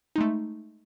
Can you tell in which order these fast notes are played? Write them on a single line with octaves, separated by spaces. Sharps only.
D#4 G#3 A3